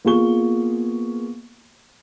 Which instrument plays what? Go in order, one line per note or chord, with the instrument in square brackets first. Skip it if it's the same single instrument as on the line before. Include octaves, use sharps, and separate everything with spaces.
[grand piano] A#3 B3 F4 G#4 C#6 G7